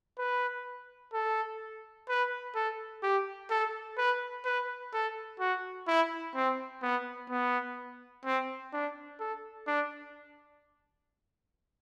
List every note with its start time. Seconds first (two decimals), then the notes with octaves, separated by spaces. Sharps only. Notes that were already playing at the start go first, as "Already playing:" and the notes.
0.18 B4
1.13 A4
2.09 B4
2.55 A4
3.03 G4
3.50 A4
3.97 B4
4.45 B4
4.93 A4
5.40 F#4
5.88 E4
6.35 C4
6.82 B3
7.30 B3
8.25 C4
8.73 D4
9.20 A4
9.67 D4